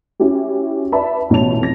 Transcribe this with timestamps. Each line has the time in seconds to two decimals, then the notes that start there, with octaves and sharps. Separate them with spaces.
0.20 C#4 E4 F#4 G4
0.92 B4 D5 E5 A5 B5
1.30 A1 B2 E3 C#5 A5 F7
1.60 F2 A#6